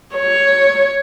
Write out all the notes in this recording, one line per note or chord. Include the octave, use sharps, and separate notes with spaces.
C#5